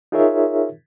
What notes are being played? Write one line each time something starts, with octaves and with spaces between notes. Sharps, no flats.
D#4 F4 G#4 A#4 C#5 E5